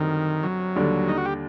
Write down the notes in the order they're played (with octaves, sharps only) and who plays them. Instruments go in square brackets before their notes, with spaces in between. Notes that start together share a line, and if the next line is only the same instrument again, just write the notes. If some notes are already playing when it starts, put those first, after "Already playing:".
Already playing: [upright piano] F#2 D3 G3 C4 [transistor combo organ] D#3
[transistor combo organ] F#3
[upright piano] D#2 D3 G3 D4
[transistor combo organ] D#4
F#4
G4